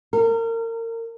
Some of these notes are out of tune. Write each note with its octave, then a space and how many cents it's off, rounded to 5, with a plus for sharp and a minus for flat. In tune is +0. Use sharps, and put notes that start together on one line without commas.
A#4 -30